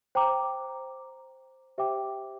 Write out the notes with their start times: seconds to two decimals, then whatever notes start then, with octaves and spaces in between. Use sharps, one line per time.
0.15 C5 G5 A#5 D6
1.78 G4 C5 E5 G5 D6